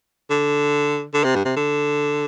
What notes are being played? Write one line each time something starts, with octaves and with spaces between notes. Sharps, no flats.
D3
D3
C3
G2
C3
D3